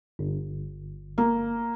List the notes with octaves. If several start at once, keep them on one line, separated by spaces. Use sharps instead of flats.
G1
A#3